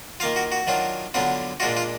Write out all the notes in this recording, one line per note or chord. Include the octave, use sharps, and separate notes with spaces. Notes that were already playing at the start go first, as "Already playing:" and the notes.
D#3 A#3 F4 F5
F#4
F#4
D#3 F#3 D4 F4
D3 F#3 B3 D4 F4
A#2 G#3 D4 F4 F#4
F4